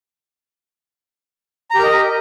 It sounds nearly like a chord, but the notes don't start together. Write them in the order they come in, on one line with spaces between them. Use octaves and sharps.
A#5 G4 A#4 D#5